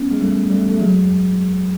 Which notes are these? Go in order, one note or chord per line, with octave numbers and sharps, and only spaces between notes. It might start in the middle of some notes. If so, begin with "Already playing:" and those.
Already playing: B3 C#4
G#3
G3 A3
G3 A3
A3
F#3 G#3